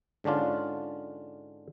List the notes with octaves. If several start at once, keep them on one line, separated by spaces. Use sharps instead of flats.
G#2 D3 C#4 D4 F4